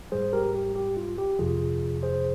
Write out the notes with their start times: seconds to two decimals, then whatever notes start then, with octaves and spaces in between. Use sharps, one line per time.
0.12 G#2 G3 G#4 C5
0.33 G4 A#4
0.54 G4
0.76 G4
0.97 F4
1.18 G4
1.39 F2 C3 F3 F4 G#4
2.03 G#4 C5